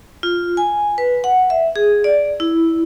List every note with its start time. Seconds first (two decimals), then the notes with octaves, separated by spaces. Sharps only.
0.23 F4
0.57 G#5
0.98 B4
1.24 F#5
1.50 E5
1.76 G#4
2.04 D5
2.40 E4